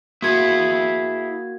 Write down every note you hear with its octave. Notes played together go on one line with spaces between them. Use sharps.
A#3 E4 F#4 G#4 G#6